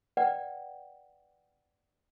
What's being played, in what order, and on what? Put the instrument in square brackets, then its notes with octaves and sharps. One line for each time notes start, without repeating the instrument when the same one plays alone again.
[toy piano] B4 D5 F#5 G5